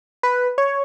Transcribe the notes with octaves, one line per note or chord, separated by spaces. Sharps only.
B4
C#5